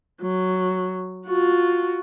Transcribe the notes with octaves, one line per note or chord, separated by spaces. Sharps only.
F#3
F4 F#4